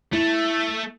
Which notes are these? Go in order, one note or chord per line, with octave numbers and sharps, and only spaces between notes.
A3 E4